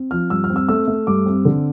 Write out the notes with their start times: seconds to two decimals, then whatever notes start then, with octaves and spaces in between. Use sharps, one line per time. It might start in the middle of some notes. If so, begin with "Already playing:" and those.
Already playing: C4
0.11 F3 F6
0.30 G2 E6
0.44 F6
0.50 C4
0.56 E6
0.69 A3 E6
0.88 A3
1.07 G2 D6
1.26 C4
1.45 D3